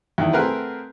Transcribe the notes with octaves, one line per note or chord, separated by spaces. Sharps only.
E2 D#3
A3 C4 G#4 A#4 B4 F#5